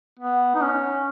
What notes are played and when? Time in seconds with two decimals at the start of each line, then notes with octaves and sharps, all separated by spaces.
0.19 B3
0.55 D#4
0.61 C#4